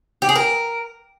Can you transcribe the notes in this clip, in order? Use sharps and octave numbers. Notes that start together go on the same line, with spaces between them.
G4
G#4
A#4